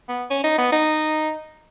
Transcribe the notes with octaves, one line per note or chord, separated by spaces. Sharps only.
B3
C#4
D#4
B3
D#4